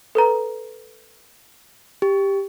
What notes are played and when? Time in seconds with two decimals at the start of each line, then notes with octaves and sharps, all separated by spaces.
0.15 A4 B4 A#5
2.02 G4